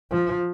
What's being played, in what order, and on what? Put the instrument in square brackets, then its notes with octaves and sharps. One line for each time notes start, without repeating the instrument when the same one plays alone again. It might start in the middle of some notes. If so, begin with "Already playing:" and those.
[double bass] F3